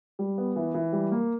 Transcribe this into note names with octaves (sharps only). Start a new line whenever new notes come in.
G3
B3
E3
E3
G3
A#3